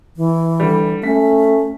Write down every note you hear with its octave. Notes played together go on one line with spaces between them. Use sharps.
E3
D3 G3
A3 C#4 B6